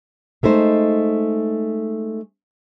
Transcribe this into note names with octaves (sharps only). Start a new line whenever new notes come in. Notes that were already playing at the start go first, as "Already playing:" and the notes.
G#3 A3 D#4 C5